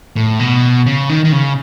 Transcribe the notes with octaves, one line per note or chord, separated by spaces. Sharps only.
A2
B2
C#3
D#3
D#3
C#3